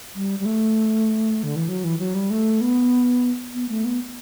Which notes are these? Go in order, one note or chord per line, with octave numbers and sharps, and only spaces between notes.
G3
G3
A3
D3
E3
F#3
E3
F#3
G3
A3
B3
B3
A3
B3